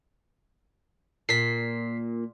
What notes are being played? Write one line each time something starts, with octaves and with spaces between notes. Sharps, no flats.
A#2 B6 C7